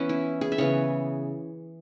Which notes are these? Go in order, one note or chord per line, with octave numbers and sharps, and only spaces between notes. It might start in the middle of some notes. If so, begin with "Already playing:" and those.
Already playing: E3 B3 C#4
E4
G#4
E5
C#3 E3 B3 C#5